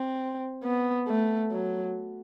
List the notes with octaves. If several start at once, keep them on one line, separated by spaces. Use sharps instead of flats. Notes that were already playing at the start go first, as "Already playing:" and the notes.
Already playing: C4
B3
A3
F#3